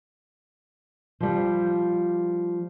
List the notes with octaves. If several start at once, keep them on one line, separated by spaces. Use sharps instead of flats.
F3 G3